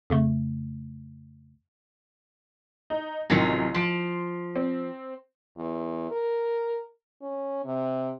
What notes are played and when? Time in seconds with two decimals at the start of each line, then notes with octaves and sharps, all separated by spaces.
0.10 F2 C#3 A3
2.90 D#4
3.30 A1 F#2 C3 D#3 F4 A#6
3.74 F3 C6 D7
4.56 C4
5.58 E2
6.11 A#4
7.22 C#4
7.65 C3